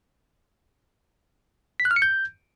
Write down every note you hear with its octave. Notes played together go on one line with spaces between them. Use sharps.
B6
F#6
F6
C#7
G6